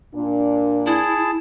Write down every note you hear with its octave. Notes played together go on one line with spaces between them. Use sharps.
A#2 D4
E4 G#4 A5